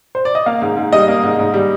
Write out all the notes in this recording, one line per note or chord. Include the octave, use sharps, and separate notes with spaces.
C5
D5
D#5
A#3 F5
G#2
G#2
G3 D#5
A#3
G#2
G#2
G3